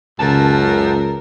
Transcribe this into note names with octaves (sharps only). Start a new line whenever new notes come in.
C#2 F#2 C#3 A#4 A5